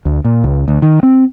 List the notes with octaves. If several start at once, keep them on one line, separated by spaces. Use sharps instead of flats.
D2
A#2
C#2
D2
D#3
C4